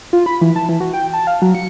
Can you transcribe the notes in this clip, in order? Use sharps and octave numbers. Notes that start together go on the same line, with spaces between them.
F4
B5
E3
A5
E3
F#4
G5
A5
F5
F#3
C#7